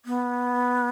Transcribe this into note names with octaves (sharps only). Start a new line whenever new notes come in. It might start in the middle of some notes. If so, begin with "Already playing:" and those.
B3